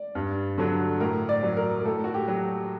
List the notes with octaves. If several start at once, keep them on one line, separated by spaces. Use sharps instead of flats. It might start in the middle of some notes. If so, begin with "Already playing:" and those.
Already playing: D5
G2
D3 F#3
A2 A#4
D5
F#3
A#4
A#4
A2 A4
F#4
G4
F#3